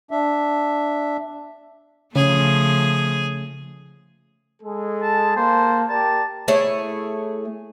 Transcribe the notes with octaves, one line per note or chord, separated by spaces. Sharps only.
D4 E5
C#3 F3 A3 G#4
G#3 G#4 A4
A5
A#3 C5 A5
G4 A#4 D5 A5
A3 E4 G#4 C#5